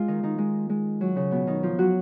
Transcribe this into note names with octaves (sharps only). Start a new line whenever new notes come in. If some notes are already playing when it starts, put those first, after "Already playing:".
Already playing: G#3 F4
D#3 D#4
D#3 D#4
G#3
G#3
F#3
C#3 C#4
B2 B3
D#3 D#4
F3 F4
F#3 F#4